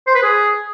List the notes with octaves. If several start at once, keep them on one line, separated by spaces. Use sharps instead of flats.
C5
B4
G#4